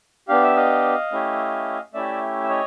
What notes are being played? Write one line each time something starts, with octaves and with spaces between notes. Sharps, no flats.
B3 D4 G4 F5
E5
D#5 F5
A3 C#4 E4 G4
A3 C#4 E4 G4 D5 E5
E5
C#5 D#5